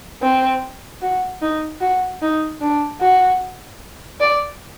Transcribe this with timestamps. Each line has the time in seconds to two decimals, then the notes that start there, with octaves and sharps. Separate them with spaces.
0.22 C4
1.02 F#4
1.42 D#4
1.81 F#4
2.22 D#4
2.61 D4
3.00 F#4
4.20 D5